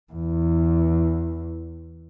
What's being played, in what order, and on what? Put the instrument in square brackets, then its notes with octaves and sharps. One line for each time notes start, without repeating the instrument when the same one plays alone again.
[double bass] E2